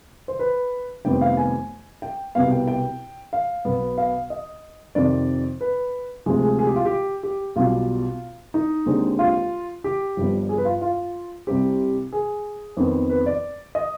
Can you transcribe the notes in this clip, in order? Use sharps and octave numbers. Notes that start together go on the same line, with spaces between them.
C5
B4
F1 F2 D#3 G3 B3 G5
F5
G#5
G5
C2 B2 B3 F5
G5
G5
F5
B1 B2 B3
F5
D#5
F2 C3 D#3 D5
B4
D2 C3 F3 G#3
G#4
G#4
G4
F4
G4
G4
B1 B2 G3 F4
D#4
D#2 D3 G#3 C4
F4
G4
G1 G2 F3
G#4
B4
F4
F4
C2 C3 G3 C4 G4
G#4
F2 D#3 B3
B4
D5
D#5